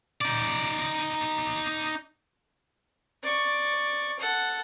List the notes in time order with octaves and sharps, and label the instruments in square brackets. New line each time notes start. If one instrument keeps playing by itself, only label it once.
[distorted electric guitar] D#4 D5
[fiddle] D5 C#6
A4 F#5